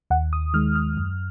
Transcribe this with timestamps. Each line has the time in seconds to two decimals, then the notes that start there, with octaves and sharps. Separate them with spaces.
0.10 D#2 F#5
0.33 D#6
0.54 D#3 G#3 F6
0.76 F6
0.97 F#2